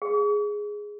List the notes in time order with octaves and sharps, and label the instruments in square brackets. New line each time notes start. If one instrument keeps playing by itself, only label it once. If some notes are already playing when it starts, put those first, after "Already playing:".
[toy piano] G#4